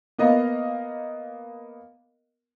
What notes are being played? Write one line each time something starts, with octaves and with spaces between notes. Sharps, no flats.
A#3 B3 A#4 D#5 F5